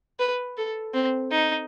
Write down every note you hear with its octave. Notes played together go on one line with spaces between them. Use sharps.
B4
A4
C4
D#4